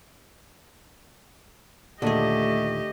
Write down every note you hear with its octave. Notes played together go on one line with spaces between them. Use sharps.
D#2 A#2 D3 A3 G4 G#4 D#5